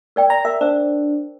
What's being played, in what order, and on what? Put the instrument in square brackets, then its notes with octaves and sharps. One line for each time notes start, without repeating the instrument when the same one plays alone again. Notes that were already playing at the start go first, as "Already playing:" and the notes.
[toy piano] A#4 D5 G5
[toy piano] D5 [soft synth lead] A#5
[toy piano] A#4 [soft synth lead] E5
[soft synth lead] D4 [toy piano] C5 E6